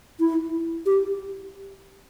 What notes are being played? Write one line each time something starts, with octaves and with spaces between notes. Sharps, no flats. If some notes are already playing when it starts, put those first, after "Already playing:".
E4
G4